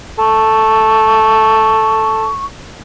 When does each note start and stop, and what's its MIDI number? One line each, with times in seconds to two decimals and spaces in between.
0.19 2.28 69
0.19 2.45 85